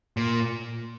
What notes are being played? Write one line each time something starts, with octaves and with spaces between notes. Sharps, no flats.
A#2